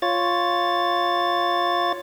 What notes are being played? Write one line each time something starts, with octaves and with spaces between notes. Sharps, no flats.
F4 C#5 A6